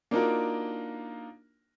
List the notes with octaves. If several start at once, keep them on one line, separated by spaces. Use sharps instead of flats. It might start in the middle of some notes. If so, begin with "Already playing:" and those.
A#3 D4 D#4 F4 F#4 A#4